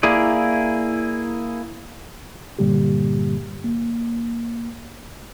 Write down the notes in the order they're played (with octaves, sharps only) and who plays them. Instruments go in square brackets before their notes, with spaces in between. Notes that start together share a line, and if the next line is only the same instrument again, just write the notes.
[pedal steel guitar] A#3 E4 G#4 D5
[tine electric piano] G2 A#2 D3 G3 A#3 G4
A#3